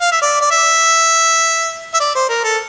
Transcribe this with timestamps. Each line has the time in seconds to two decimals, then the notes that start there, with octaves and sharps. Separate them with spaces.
0.01 F5
0.12 E5
0.22 D5
0.41 D5
0.51 E5
1.94 E5
2.00 D5
2.15 C5
2.29 A#4
2.44 A4